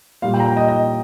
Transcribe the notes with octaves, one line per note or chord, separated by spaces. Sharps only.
A#2 G3 F5
G5
A#5
G5
D#5
D#5